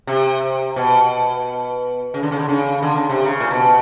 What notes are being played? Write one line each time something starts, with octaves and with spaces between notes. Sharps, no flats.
C3
B2
C#3
D3
C#3
D3
C#3
D3
C#3
C3
C#3
A#2
B2